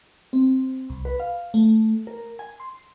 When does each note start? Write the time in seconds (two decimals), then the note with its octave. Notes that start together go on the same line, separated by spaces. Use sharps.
0.33 C4
0.90 C2
1.05 B4
1.20 F5
1.54 A3
2.07 A#4
2.39 G#5
2.60 C6